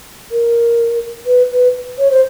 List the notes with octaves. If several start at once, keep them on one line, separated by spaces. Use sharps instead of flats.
A#4
B4
B4
C#5
C5